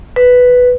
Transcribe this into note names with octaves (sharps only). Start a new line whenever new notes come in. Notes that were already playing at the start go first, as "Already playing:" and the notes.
B4